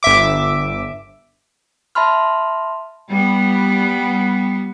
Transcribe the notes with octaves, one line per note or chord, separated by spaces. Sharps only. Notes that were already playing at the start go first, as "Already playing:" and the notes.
G1 E5 D6
E5 A5 B5 C6 F6
G3 B3